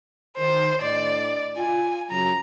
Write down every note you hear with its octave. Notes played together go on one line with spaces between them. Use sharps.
D#3 C5
A2 D4 D5 D#5
F4 G#5
F#2 C#3 F#3 A#5